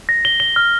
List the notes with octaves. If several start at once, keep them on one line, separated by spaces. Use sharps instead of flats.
A#6
G7
G7
F6